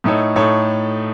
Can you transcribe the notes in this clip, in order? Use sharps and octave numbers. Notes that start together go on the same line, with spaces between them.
A2 A3 D#4 A4 C#5
A2 A3 D#4 A4 C#5